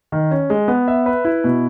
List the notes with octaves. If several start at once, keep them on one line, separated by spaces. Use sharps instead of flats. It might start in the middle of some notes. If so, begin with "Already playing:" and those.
D#3
C#4
G#3
B3
E5
B4
E4
B2